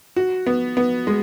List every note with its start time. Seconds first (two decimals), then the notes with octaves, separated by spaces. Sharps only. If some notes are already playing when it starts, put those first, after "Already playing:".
0.16 F#4
0.46 B3
0.77 B3
1.07 G#3